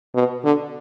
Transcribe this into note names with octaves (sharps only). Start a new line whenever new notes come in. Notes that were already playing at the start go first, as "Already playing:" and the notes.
B2
D3